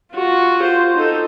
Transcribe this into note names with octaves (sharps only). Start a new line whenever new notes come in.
F4 F#4
F4 C5
D#4 A4